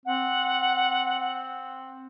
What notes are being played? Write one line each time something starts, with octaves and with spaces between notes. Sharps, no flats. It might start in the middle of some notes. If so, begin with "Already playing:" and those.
C4 F#5